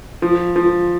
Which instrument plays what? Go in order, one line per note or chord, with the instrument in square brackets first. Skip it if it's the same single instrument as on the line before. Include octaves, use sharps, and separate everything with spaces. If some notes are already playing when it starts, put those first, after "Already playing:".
[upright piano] F3
F3